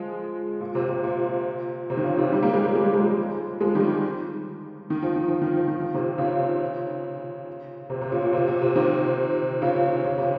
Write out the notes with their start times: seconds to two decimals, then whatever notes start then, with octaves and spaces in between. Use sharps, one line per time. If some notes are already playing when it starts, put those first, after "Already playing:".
Already playing: F3 G#3
0.61 A#2
0.75 C3
0.89 C3
1.04 A#2
1.90 C3
1.97 D#3
2.03 A#2 C#3
2.18 C3 D#3
2.32 D#3 G3
2.43 G3 A#3
2.53 F3 G#3
2.75 G#3
2.84 G3
2.93 F3 G#3
3.61 F3 G#3
3.75 D#3 G3
4.90 D#3
5.02 F3
5.16 D#3
5.28 F3
5.42 D#3
5.55 F3
5.68 D#3
5.81 F3
5.94 C3 D#3
6.18 A#2 C#3
7.90 C3
8.01 C3
8.12 A#2 C#3
8.22 A#2
8.33 C3
8.48 A#2
8.62 C3
8.76 C3 D#3
9.62 A#2 C#3
10.05 C#3
10.18 C3